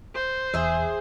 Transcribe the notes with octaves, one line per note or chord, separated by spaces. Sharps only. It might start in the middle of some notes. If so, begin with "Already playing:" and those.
C5
E1 E2 G#4 E5